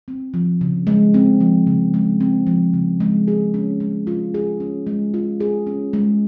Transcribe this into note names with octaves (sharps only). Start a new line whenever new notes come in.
C4
F3
C#3
G#3
C4
F3
C#3
G#3
C4
F3
C#3
G#3
G#4
C#4
G#3
F4
G#4
C#4
G#3
F4
G#4
C#4
G#3